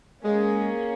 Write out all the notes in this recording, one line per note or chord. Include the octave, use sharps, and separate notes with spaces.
G#3 A#3 C#4 G#4